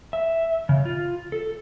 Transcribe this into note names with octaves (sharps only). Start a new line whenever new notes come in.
E5
C#3
F4
A4